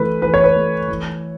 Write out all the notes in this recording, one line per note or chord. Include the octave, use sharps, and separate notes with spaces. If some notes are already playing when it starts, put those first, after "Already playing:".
Already playing: E3 A3 B4
E3 B4
C#5
B4
A3
E3